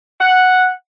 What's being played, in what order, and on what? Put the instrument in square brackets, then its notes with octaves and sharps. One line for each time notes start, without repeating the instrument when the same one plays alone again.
[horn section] F#5